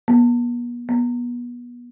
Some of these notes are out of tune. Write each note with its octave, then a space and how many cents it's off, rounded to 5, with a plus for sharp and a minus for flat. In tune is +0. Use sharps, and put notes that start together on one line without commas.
B3 -40
B3 -30